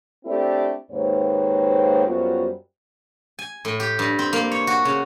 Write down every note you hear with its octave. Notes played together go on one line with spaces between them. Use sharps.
A3 C4 D4 E4 G4 A4
D#2 G#2 A#3 C4 B4 C#5
F#2 G3 B3 F4 F#4 C5
G#5
A2
G4
G2
C4
A#3
C#5
F#4
C#3